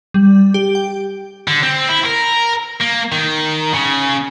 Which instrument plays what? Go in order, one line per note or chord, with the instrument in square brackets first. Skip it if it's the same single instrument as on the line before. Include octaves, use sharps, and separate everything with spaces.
[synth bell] G3
G4
G5
[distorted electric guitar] D3
C4
E4
A#4
A#3
D#3
C#3